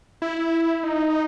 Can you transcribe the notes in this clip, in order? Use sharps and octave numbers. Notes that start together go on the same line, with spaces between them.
E4
D#4